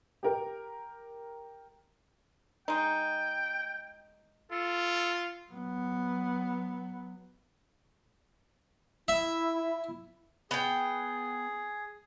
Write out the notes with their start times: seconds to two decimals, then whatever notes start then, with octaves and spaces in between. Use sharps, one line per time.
0.23 G4 A#4
2.68 G#3 D#4 G5
4.51 F4 A4
5.52 F#3 B3
9.08 E4 E5
10.51 B3 G#4 G5